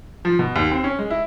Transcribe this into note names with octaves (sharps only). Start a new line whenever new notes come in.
F3
B2
D#2
C4
C#4
G#3
E4